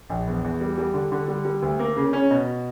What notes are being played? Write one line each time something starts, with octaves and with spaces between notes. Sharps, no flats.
A#1
E2
E2
G3
G3
D3
D3
G3
G3
D2
A#3
C#3
C#4
B2